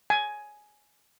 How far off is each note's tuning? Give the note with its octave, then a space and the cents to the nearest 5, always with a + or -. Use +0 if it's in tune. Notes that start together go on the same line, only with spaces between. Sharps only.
G#5 +10